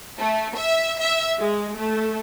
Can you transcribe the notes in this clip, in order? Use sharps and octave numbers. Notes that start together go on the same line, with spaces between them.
A3
E5
E5
G#3
A3